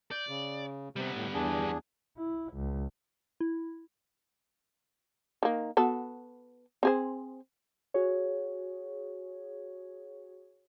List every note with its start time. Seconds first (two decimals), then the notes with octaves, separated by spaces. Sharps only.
0.11 D5 G6
0.29 C#3
0.96 C3 G3 B3
1.16 A2
1.34 E2 D4 G#4
2.17 E4
2.53 C#2
3.40 E4
5.43 D#3 A#3
5.77 B3 F#4 A4
6.83 C4 G#4 C5
7.94 F#4 G#4 C#5